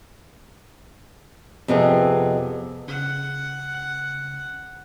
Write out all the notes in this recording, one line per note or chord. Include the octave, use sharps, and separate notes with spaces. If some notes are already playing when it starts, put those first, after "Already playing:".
F2 C3 B3 G#4
C#3 F#5